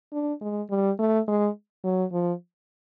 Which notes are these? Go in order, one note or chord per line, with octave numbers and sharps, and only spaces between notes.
D4
G#3
G3
A3
G#3
F#3
F3